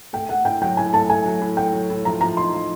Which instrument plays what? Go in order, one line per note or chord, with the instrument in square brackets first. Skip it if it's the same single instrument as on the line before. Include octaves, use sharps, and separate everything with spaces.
[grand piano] A3 [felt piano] G5
[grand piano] A3 [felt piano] F#5
[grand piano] A2 [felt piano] G5
[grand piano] F#3 [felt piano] G5
[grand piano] A2 [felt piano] G#5
[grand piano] A3 [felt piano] A5
[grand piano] A3 [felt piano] G#5
[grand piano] F#3
A2
[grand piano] A3 [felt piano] G5
[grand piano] F#3
A2
[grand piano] F3 [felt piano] A#5
[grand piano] F3 [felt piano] A#5
[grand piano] D#4 [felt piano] C6
[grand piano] F3